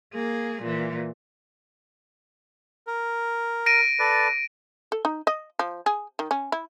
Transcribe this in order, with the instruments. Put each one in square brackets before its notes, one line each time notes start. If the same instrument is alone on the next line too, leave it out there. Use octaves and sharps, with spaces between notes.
[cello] A#3 G#4
A#2 E3
[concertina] A#4
[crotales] A#6 D7 D#7
[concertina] A4 B4 D5
[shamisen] A4
D#4
D#5
F3
G#4
D#3
C#4
E4